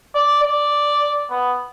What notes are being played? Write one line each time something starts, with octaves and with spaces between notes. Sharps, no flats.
D5
D5
B3